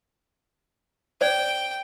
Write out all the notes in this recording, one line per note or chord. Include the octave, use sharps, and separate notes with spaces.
C5 D5 G5